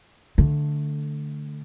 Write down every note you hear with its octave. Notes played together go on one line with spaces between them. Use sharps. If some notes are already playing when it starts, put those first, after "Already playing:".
D3 A3